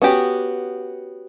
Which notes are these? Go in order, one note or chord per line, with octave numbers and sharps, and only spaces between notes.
B3 C#4 F#4 G4